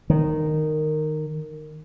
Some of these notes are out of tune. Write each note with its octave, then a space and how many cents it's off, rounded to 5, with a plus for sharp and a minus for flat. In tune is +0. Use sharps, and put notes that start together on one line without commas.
D#3 -15